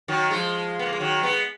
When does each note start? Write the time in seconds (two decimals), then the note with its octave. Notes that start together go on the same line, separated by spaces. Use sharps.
0.08 D#3 F#3
0.31 F3 G#3
0.79 B3
0.86 A#3
0.93 G#3
1.00 D#3 F#3
1.23 G#3 B3